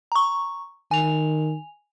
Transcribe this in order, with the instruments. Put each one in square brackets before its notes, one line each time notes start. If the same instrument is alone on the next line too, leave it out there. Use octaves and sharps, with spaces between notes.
[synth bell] A#5 C#6
[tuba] D#3 [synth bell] G#5 F7